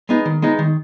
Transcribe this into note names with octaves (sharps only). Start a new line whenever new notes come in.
G#3 B3 D#4
D#3
G#3 B3 D#4
D#3